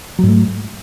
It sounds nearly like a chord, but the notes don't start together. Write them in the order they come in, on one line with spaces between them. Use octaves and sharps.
F#3 G#2 A3